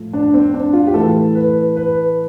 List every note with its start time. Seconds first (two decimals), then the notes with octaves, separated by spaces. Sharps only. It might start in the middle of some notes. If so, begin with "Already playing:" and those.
Already playing: A2 F3 A3
0.13 D4
0.34 C4
0.54 D4
0.73 F4
0.87 G4
0.94 A2 E3 A3 A4
1.35 B4
1.76 B4